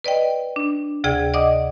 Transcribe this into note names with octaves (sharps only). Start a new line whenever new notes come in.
B4 D5 D#5 G5
D4
D2 C3 G#4 D5 G5 G#6
D5 D#5 F#5 D6 D#6